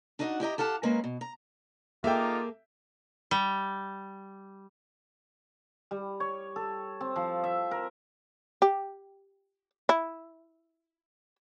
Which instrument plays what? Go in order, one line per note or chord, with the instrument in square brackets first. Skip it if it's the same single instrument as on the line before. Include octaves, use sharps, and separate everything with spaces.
[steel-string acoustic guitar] D4 D#4 F#4 D#5 F5 F#5
E4 G4 D#5 A#5
G4 A4 F5 F#5 A5
G#3 A#3 C#4 A#4 B4
B2
A#5
[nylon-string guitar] A#3 G#4 A4 [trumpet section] D#4 F4 D6 [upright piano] E5 G5
[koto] G3
[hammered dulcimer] G3
C#5
A4
C4
F3
E5
A#4
[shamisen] G4
E4